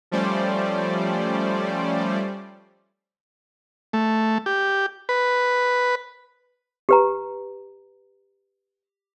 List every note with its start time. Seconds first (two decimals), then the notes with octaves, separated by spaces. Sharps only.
0.11 F3 G3 A3 C#4 C5 D5
3.93 A3
4.46 G4
5.09 B4
6.89 G4 B4 A#5